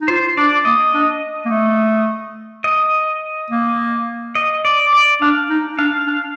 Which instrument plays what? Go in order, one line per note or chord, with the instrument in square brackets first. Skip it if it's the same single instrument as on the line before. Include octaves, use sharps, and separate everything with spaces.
[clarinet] D#4
[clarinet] F4 [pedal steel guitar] C5
[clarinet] D4 [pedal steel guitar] D5
[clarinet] A#3 [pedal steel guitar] D#5
[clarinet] D4
A#3
A3
[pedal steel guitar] D#5
[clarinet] A#3
[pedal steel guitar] D#5
D5
D5
[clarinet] D4 [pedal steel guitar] F5
[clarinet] D#4
[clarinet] D4 [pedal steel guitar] F5
[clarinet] D4